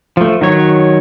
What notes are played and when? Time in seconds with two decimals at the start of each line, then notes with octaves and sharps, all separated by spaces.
0.17 F3 A3
0.41 D#3 F#3 C#5